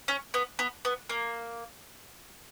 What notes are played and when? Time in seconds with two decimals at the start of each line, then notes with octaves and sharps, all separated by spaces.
0.08 C#4
0.34 B3
0.59 B3
0.85 B3
1.09 A#3